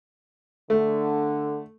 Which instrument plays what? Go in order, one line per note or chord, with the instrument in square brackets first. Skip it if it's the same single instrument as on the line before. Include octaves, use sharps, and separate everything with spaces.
[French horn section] D3 [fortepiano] A3